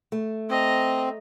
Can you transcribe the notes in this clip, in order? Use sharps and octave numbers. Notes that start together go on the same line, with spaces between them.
A3
C4 D#5 A#5